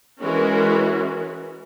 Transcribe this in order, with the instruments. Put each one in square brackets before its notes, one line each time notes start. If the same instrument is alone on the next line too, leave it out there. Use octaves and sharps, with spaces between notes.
[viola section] E3 G#3 C#4 F#4 A#4